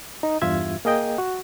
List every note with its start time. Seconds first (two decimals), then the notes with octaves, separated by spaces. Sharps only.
0.23 D#4
0.42 E2 G2 F4 E5 G#6
0.85 A#3 G#4 D#5 G5 D#6
1.18 F#4